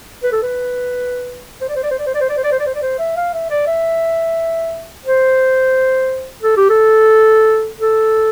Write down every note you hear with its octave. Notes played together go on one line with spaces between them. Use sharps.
B4
A4
B4
C5
D5
C5
D5
C5
D5
C5
D5
C5
D5
C5
D5
C5
D5
C5
D5
C5
E5
F5
E5
D5
E5
C5
A4
G4
A4
A4